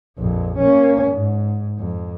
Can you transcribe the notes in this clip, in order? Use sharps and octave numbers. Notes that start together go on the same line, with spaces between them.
A#1 F2
A#3 C#4
G#2
F2